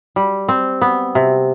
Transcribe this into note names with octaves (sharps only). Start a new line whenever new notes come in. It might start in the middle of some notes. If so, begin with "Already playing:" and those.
G3
C4
B3
C3